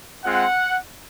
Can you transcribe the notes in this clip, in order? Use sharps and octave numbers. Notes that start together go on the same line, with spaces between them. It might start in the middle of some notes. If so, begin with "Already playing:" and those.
G#3 C4 F4 F#5